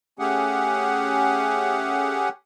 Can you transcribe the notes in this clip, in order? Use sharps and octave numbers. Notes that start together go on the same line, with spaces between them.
A3 C#4 G4 G#4 F#5